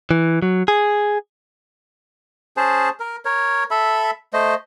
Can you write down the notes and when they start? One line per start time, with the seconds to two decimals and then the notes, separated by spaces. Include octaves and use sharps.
0.11 E3
0.42 F#3
0.68 G#4
2.57 C#4 G#4 C5 A5
3.00 A#4
3.25 A#4 C#5
3.71 A4 E5 B5
4.33 A3 C5 D#5